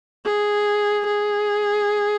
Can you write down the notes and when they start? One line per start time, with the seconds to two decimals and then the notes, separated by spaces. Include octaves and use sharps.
0.25 G#4
1.07 G#4